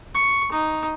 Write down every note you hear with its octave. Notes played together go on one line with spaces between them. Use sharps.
C#6
D#4